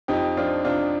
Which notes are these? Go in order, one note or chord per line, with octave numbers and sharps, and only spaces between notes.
F2 D#4 G4
F3 D4 F4
C3 D4 F4